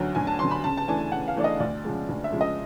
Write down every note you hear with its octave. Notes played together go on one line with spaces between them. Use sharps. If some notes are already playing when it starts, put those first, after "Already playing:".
Already playing: D2 D3 F#3
D2 G#5
A5
D3 F#3 C6
B5
C#3 A5
A5
E3 A3 D4 G#5
C#3 F#5
F5
E3 A3 D4 D5
D#5
D2 D5
C#3 F3 G#3
D2
E5
C#3 F3 G#3
D#5